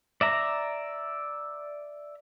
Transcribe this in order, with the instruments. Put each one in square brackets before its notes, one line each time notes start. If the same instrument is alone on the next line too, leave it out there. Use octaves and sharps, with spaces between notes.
[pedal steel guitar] D5 E5 A#5